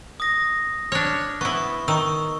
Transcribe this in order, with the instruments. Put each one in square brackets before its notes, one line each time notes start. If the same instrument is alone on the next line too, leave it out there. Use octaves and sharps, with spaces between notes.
[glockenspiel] D#6 A#6
[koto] D4 C#5 [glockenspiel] F6 F#6
[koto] B3 E4 [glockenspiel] C#6
[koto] D#3 [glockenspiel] C#6 E6